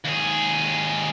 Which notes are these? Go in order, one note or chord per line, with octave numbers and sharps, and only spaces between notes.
D#2 G#4